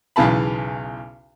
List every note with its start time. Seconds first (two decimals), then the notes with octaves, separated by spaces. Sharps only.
0.16 B1 E2 C#3 E3 A5 B5